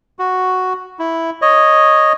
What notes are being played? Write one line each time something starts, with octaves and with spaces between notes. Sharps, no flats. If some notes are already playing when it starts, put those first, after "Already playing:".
F#4
E4
C#5 D#5